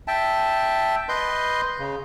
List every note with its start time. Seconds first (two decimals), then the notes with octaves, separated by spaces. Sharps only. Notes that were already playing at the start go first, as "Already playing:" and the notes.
0.08 E5 G5 A5
1.09 B4 D#5 C6 G6
1.79 C#3